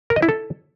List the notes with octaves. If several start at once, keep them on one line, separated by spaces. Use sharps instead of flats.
A#4
D#5
E4
A4